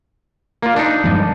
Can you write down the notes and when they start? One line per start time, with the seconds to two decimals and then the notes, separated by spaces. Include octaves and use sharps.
0.62 A#3 F4
0.76 D4 D#4
1.04 G2 F3 G#3